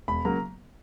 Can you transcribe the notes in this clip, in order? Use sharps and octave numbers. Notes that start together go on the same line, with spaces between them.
E1 B5
C#3 F#3 A#3 A#5